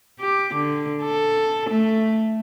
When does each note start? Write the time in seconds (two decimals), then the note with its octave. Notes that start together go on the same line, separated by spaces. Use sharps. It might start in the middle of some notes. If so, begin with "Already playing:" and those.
0.20 G4
0.54 D3
1.04 A4
1.70 A3